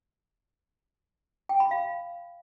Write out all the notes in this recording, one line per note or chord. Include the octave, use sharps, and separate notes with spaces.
G5
B5
F5